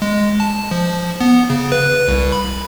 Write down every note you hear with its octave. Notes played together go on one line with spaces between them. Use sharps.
G#3
A5
F3
B3
C#3
B4
C2
B5